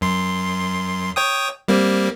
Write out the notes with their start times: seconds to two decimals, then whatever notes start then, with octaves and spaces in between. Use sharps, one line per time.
0.01 F#2 C6
1.16 C#5 G5 D#6
1.68 G3 A#3 C4